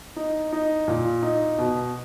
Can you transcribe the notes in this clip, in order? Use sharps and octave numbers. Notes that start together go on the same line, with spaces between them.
D#4
D#4
A#2
D#4
B2